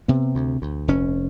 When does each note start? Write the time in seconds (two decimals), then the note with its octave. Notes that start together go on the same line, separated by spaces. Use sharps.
0.08 C3 B3
0.35 D2
0.62 D2
0.88 F1 C#4